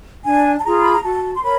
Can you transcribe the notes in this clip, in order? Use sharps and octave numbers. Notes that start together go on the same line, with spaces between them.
D4 G#5
A5
F4 G#4 A#5
B5
A#5
F#4 A5
C6
A#4 C#5 B5